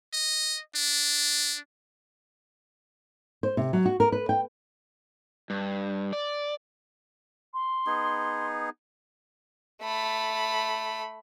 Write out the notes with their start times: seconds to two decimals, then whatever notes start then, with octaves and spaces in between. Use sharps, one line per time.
0.13 D#5
0.75 D4
3.43 C5
3.57 C3
3.73 F#3
3.86 F#4
4.00 A#4
4.12 B4
4.29 G5
5.50 G2
6.13 D5
7.53 C6
7.87 B3 D#4 G#4
9.82 A3 B5